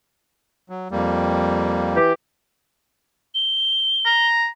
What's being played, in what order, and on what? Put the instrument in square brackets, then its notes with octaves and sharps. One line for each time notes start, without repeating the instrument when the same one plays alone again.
[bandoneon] F#3
F2 G3 A#3
[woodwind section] E3 G4
[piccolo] G7
[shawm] A#5